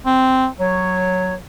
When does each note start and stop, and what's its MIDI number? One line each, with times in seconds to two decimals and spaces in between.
0.06 0.47 60
0.59 1.36 54
0.59 1.34 73